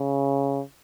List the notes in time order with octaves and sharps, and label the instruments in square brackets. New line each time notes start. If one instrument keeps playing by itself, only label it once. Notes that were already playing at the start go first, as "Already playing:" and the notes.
Already playing: [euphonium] C#3